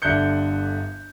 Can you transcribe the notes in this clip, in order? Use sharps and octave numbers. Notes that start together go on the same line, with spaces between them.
G1 D3 E5 F#6 G6 C#7